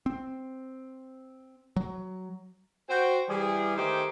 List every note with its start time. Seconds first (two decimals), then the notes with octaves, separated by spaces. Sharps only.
0.06 C4
1.76 F#3
2.90 F#4 C5 G5
3.29 E3 G3 G#4
3.77 D#3 A3 D#4 G4 G#4 C5